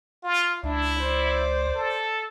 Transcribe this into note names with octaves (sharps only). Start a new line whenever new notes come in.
F4
C#2 D4 E4
C5 D5
A4